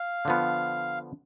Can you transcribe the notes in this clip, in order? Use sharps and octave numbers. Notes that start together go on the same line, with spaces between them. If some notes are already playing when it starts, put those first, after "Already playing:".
Already playing: F5
D3 F3 B3